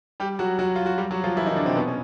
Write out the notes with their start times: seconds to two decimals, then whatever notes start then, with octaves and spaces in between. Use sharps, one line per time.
0.20 G3 G4
0.39 F#3 F#4
0.59 F#3 F#4
0.76 F4
0.86 F#4
0.98 G3 G4
1.11 F#3 F#4
1.24 F3 F4
1.36 E3 E4
1.46 D#3 D#4
1.56 D3 D4
1.66 C3 C4
1.76 B2 B3
1.88 C#4